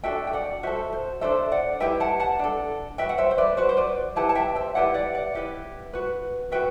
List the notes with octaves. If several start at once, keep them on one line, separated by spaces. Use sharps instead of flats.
D4 F#4 A4 E5 G5
G5
D5 F#5
F#4 A4 C5 E5
C5
D4 A4 C5 E5
D5 F#5
E4 G4 B4 E5 G5
F#5 A5
F#5 A5
D4 A4
F#4 B4 E5 G5
F#5
C5 E5
C5
B4 D5
F#4 B4 C5
C5
B4 D5
E4 G4 B4 F#5 A5
A5
E5 G5
C5 E5
E4 G4 B4 D5 F#5
D5 F#5
D5 F#5
E4 G4 B4
F#4 B4
F#4 B4 E5 G5